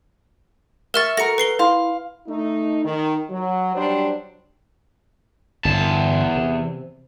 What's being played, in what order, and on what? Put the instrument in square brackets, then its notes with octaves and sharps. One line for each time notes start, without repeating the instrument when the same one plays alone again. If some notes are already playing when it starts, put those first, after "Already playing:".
[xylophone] A#4 F6 A6 [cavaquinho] E5 C#6
[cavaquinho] F#4 A#4 [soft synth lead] A4 [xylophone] A#6 C#7
[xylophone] B4 C7 G7
[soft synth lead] E4 [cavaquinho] F5 C6
[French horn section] A3 D#4
D#3
F#3
F#3 G3 D4 C5
[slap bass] G1 [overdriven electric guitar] E2 A5
[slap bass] C3